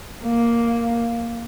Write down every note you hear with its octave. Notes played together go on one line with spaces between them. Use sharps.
A#3